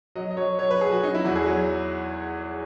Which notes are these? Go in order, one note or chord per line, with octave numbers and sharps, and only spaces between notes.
F#3 D#5
D#5
F#3 C#5
F#3 C#5
B4
F#3 G#4
F#4
F#3 D#4
E4
E2 F#4
G#4
F#3